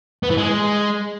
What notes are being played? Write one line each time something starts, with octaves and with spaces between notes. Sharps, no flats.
B3
E3
G#3